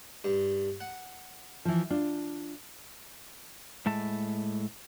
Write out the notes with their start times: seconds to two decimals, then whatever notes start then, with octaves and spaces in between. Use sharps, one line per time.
0.24 G2
0.80 F#5
1.65 E3 F3
1.90 D4 F4
3.86 A2 G#3 E5 A5